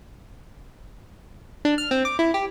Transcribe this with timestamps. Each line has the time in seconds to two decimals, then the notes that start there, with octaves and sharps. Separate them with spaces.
1.65 D4
1.78 F6
1.91 C4
2.05 D6
2.19 E4
2.34 G4